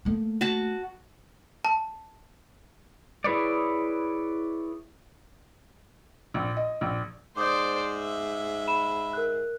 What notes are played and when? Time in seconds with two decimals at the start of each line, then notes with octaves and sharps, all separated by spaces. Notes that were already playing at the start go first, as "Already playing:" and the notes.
0.05 A3 A#3
0.41 F#4 A5
1.65 A5
3.24 E4 G#4 B4 C#5 D5
6.34 A#1
6.57 D#5
6.81 A#1
7.37 G#2 C5 D5 D6 D#6 G6
7.99 E5
8.67 B5 E7
9.13 A#4 F#6